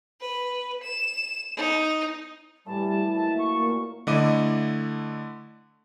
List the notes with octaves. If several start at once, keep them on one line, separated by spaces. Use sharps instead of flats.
B4
E7
D#4
A2 E3 G3 F#4 A5
A5
F#3 G#3 A#3 E5 A5
C#6
A#2 A#3
D3 A3 E4 D#5 D6 D#7